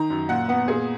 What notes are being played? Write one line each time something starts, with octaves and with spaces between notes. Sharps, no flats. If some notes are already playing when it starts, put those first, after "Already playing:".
Already playing: D#3 A#5
F#2
A#2 F#5
B3 F#5
A#2 G#4